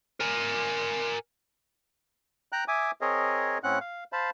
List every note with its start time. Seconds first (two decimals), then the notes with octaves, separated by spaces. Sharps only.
0.20 A#4 G#5
2.52 G5 A#5 F#6
2.68 E5 G#5 D6 D#6
3.01 C4 G#4 A#4 C#5 D#5
3.63 A2 C4 C#4 F#5 F#6
3.81 F5
4.13 C5 F5 A5 B5